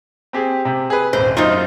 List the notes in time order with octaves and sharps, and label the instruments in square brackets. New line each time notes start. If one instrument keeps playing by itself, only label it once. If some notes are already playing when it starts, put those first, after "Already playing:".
[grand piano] C4 G4 G#4
C3
G#4 B4
[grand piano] D#1 G#1 [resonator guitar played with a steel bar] C5
[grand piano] F#2 [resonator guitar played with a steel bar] D#4 F4 C5